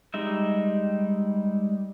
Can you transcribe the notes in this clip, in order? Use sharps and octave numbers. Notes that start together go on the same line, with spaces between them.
G3 G#3 D#4 E5